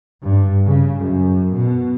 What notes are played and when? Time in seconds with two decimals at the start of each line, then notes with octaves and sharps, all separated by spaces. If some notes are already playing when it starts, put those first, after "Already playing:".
0.22 G2
0.65 C#3
0.99 F#2
1.53 B2